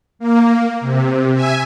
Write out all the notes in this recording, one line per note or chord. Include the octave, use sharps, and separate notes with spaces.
A#3
C3
E5 G#5